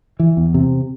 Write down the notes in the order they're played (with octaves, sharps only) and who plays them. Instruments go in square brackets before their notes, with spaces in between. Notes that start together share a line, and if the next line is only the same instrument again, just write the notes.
[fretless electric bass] E3
E2
C3